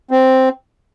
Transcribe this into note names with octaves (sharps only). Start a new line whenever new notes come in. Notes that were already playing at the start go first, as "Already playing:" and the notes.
C4